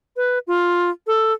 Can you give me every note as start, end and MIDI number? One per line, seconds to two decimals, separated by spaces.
0.16 0.39 71
0.47 0.90 65
1.07 1.33 69